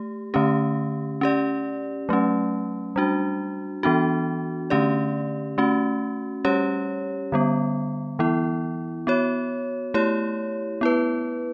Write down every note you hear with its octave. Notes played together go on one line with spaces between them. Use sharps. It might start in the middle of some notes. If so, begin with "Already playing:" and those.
Already playing: A3 G4
D3 A3 C#4 G4
C#4 G4 D5
F#3 A3 C#4
G3 D4 F#4
E3 B3 D4 F#4
D3 A3 C#4 G4 D5
A3 C#4 F#4
G3 C#4 G4 C#5
D3 G3 B3
E3 B3 E4
B3 F#4 C#5
A3 E4 G4 C#5
B3 E4 B4